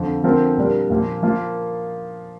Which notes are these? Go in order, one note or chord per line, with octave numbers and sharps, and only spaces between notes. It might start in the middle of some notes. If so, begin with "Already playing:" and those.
Already playing: F2 D3 F3
D3 F3 C4 F4 A#4
A#2 G3 D4 A#4
A#2 F3 A#3
F3 A#3 F4 A#4